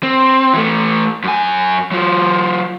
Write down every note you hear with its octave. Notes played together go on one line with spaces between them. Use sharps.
C4
E3 A3
F#2 G#5
F#3 F4